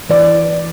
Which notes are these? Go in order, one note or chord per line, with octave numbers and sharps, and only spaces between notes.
E3 D5